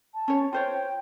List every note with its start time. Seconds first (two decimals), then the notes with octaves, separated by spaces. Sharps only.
0.15 A5
0.28 C#4 C#5
0.53 F4 C5 C#5 G5